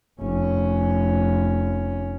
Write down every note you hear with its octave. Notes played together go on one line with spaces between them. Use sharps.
F1 C#4